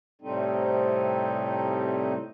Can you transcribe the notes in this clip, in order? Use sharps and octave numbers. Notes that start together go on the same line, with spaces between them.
A2 C3 G3 A3 C4 D#4